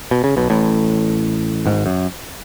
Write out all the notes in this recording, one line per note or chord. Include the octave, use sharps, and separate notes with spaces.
B2
C#3
B1 B2
A1 A2
G#1 G#2
F#2